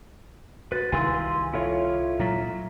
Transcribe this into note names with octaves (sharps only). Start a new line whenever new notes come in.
F#4 B4 A6
C2 D#3 E4 F5 G#5 C6 E6
E4 F4 A4 C#5 F5
A#2 F#3 A#5 B6